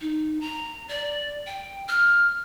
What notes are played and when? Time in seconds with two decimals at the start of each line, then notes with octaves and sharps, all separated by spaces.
0.01 D#4
0.41 A#5
0.89 D5
1.46 G5
1.88 F6